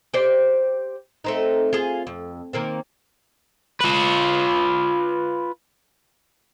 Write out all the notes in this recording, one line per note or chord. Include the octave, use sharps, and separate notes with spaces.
G4 C5 D5
A3 C4 D#4
F4 G#4
F2
D#3 A#3 C4
F4 B4